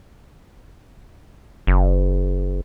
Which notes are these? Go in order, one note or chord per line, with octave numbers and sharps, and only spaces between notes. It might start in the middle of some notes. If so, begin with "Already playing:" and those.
F#1